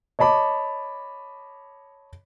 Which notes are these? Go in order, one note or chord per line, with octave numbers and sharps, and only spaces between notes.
C#5 D#5 A5 B5 D6